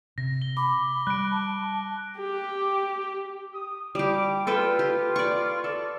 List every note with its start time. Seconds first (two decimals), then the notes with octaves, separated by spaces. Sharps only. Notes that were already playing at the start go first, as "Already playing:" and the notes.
0.18 C3 A#6
0.42 G7
0.57 B5 D6
1.07 G3 F#6 D7
1.31 A5
2.19 G4
3.54 D#6
3.95 G3 G4 D6
4.47 F4 A4 B4 G5
4.79 G4
5.16 D5 C#6
5.64 A4 D5